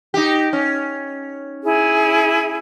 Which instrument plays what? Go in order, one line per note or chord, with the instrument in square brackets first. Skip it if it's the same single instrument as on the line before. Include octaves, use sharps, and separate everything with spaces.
[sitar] D#4 G4
C#4
[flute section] E4 G#4